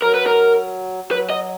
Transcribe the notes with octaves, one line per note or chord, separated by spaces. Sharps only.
F#3 A#4
B4
A#4
F#3 B4
D#5